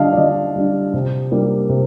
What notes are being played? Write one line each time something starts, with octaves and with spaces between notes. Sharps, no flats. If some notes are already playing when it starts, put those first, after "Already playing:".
Already playing: D3 G3 D4 D#5 F5 A5
D5
D3 D#5
G3 D4
C3
G3 A#3 D4
C3